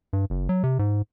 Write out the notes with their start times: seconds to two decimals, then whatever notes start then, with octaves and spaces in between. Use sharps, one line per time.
0.13 G2
0.30 F#1
0.49 F#3
0.63 C3
0.79 G#2